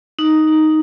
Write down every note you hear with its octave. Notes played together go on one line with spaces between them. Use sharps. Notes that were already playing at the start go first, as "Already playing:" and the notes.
D#4